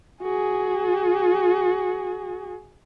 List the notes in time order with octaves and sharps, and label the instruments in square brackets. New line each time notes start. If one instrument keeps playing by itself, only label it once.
[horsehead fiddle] F#4 G#4